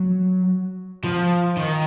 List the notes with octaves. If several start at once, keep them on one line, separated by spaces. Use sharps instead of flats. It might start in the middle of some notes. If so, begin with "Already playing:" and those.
Already playing: F#3
F3
D#3